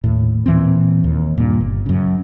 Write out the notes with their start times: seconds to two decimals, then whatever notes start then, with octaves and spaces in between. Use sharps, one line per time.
0.04 D#2 A2
0.46 A#2 E3 C4
1.04 D#2
1.38 G2 A#2
1.60 G1
1.86 F#2 C#3